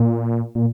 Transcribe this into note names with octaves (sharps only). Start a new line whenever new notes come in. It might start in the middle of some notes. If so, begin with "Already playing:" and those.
Already playing: A#2
A#2